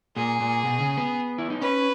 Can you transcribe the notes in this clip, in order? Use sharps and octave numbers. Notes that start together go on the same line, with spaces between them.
A#2 G#4
A#2
B2
C#3
B3
E4
D#4
C#4 B4